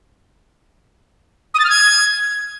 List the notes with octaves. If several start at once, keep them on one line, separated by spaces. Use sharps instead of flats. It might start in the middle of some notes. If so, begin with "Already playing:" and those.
D#6
A6
F6
G#6